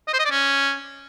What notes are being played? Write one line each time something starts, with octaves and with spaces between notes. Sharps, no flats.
D#5
C5
D#5
D5
C#4